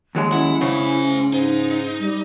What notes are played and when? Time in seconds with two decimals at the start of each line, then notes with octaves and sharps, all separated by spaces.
0.15 D#2 F#3 G#3
0.32 C#4 E4 F#5
0.62 C#3 C5 G#5
1.33 G#2 D#4
2.00 G3